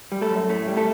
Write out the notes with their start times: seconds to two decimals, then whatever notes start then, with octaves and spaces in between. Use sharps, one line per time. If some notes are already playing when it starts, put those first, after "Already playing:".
0.12 G3
0.21 A3 A4
0.31 F#2
0.49 A2 A3 A4
0.68 G3
0.77 A3 A4